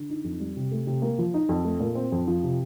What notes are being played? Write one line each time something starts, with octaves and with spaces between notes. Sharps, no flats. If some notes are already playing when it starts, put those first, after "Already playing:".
Already playing: D3
D#4
F2
G3
C3
A3
C3
A#3
F3
D#4
F2
A3
A#2
C4
F2
F3
C3